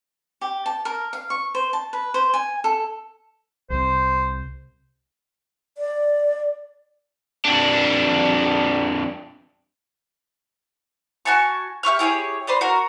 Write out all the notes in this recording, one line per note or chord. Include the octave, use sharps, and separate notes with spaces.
G4
A5
A#4
F5
C#6
C5
A5
B4
C5
G#5
A4
C2 C3 C5
D5
F2 D4
F#4 G#5 A5 C#6
G4 E5 C#6 F6
E4 G4 G#4 C#5
B4 C5 D5 D#5
F#4 A#4